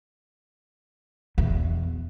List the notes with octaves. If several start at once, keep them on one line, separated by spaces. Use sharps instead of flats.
E2 B2